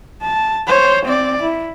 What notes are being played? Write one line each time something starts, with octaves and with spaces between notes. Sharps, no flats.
A5
C5 C#5
C4 D5
E4